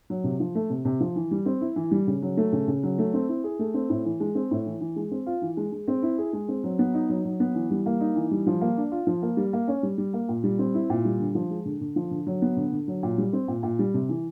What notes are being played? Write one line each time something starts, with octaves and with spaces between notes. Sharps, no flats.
F#3
C3
F3
A3
C3
C3
F3
E3
G3
C4
E4
E3
G3
C#3
F#3
A3
C#3
C#3
F#3
A3
C4
E4
G#4
A3
C4
A2
E3
G#3
C4
A2
E3
E3
G#3
C4
F4
E3
G#3
G#3
C4
E4
G#4
G#3
C4
F#3
B3
D#4
F#3
F#3
B3
E3
G3
A#3
D#4
E3
G3
F3
A#3
D4
F4
F3
A#3
G3
A#3
C#4
G3
G3
A#3
A#2
G3
C4
E4
A#2
G3
D3
F3
G#3
D3
D3
F3
D3
F#3
B3
D3
D3
F#3
A#2
G3
C4
A#2
A#2
G3
C3
E3